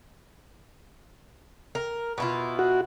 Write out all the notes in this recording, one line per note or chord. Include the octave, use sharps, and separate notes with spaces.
A#4
B2 E4 F4
F#4